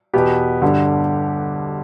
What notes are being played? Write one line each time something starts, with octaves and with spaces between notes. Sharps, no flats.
E2 B2 B3 G4
G1 G2 D3